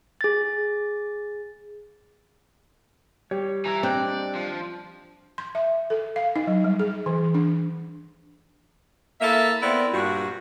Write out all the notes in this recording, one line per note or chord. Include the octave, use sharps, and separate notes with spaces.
G#4 A6
G3 G4 C#5
E3 E4 A#5
C4 D4 D5 D#5 F#6
F3
C6
E5
A4
F5
D#4
F#3
G3
G#4
E3
D4
A#3 E4 A4 E5
B3 C4 E4 A#4 D5
G2 A#2 F#4